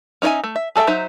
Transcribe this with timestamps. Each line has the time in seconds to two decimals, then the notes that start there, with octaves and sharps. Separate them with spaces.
0.22 C#4 D#4 C#5 E5 G#5
0.44 A3
0.56 E5
0.76 G#4 A4 D#5 E5 G5
0.87 F#3 D#4 C5 E5